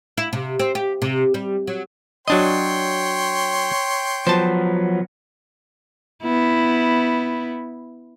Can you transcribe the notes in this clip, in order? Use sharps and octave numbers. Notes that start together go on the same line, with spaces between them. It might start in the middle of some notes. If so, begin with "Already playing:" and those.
E4
C3
C4
G4
C3
G3
F#3
F#3 D4 C#5 D#5 G5 C6
F3 F#3 B3 C5 A5
B3 E4